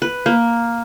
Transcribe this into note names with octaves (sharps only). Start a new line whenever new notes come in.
B4
A#3